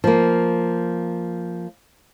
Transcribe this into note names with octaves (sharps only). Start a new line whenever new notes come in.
F3 A#3